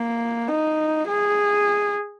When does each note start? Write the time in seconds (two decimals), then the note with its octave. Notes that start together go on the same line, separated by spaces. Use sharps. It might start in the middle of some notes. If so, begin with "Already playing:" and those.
Already playing: A#3
0.48 D#4
1.07 G#4